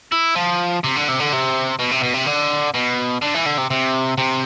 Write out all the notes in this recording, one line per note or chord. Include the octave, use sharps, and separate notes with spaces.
E4
F3
C3
D3
C3
D3
C3
B2
C3
B2
C3
D3
B2
D3
E3
D3
C3
C3
C3